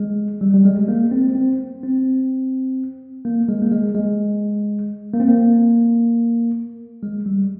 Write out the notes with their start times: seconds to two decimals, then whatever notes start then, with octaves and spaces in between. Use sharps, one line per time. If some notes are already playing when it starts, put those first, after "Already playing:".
Already playing: G#3
0.41 G3
0.54 G3
0.65 G#3
0.79 G#3
0.88 A#3
1.11 C4
1.35 C4
1.83 C4
3.25 A#3
3.49 G#3
3.62 A#3
3.72 G#3
3.95 G#3
5.13 A#3
5.20 C4
5.28 A#3
7.03 G#3
7.26 G3